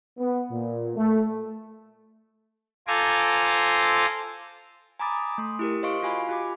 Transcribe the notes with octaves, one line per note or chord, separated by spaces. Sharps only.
B3
A#2
A3
F4 A4 C5 G#5 A#5 D6
G#5 A#5 B5 D6 D#6 A6
A3 C6 D#6
E4 G4 A#4
C5 D#5 F5 C6 C#6 D7
F4 F#4 F5 G#5 B5
F4 G4 G#5 B5 D6